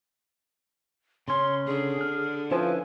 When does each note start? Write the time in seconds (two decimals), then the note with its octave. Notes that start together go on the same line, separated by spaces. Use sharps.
1.28 C#3 C#4 C6
1.66 D3 G#4
2.01 F6
2.51 F3 C#4 E4 B4 G#5